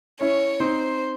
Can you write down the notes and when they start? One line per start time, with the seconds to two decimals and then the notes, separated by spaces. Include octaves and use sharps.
0.21 C#4 E4 C#5
0.60 C4 D#4 C5